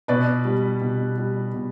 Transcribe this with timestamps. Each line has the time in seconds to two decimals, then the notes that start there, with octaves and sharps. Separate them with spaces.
0.08 B2 B4 D5
0.45 G3
0.81 B2
1.18 G3
1.54 B2